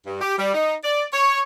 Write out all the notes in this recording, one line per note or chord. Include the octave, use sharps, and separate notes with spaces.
G2
G4
G3
D#4
D5
C#5